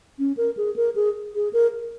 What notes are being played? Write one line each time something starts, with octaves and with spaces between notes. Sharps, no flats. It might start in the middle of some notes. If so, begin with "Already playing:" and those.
C#4
A#4
G#4
A#4
G#4
G#4
A#4